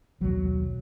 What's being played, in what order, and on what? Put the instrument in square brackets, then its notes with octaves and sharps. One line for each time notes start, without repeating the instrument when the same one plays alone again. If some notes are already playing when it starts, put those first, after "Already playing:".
[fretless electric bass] D#1 B1 F#3